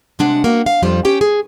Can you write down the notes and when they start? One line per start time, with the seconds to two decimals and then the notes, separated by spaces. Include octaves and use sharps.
0.19 C3 G#3 D4 F#5
0.44 A#3 F#4
0.66 F5
0.82 F2 G3 F4 C5
1.05 C#4 G4 G5
1.21 G#4